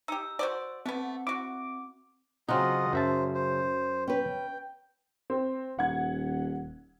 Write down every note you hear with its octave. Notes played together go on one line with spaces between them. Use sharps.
D#4 G4 E6
F#4 C5 D5
A3 B3 C4
E4 F#4 D6
C#3 F#3 C4 D#4 F4 D#5 F#5
F#2 C5 E5 A5
C5
C#4 B4 G5
C4
D#1 F#5 G#6